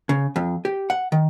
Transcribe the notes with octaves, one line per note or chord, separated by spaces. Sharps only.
C#3
F2
G4
F#5
D#3